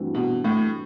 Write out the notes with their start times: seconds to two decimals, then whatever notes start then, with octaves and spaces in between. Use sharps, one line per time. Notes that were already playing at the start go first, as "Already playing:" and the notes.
Already playing: G2 E3 A3 C4 F#4
0.15 B2
0.44 A2